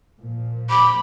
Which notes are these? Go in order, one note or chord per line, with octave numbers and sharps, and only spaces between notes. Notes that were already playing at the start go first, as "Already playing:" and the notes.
A#2 F3
B5 D6